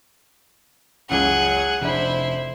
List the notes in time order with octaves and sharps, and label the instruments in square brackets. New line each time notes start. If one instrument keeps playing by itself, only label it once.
[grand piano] F#1 C#2 C#3 [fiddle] G#4 F#5
[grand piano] F1 D4 [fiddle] E4 C5